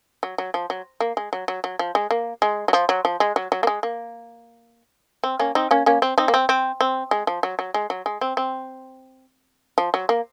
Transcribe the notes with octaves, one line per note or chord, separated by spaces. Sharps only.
F#3
F#3
F3
F#3
A#3
G#3
F#3
F#3
F#3
F3
G#3
A#3
G#3
F#3
F3
F#3
F3
G#3
F#3
F#3
A#3
G#3
A#3
C4
A#3 C#4
C4 D#4
A#3 C#4
A#3 C#4
C4
C4 D#4
A#3
C4
C4
C4
G#3
F3
F#3
F#3
G#3
F#3
G#3
C4
C4
F3
F#3
A#3